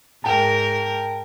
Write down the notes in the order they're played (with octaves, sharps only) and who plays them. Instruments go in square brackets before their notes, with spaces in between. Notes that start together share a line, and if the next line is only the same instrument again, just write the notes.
[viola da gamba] G#2 A#4 [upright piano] G5 A5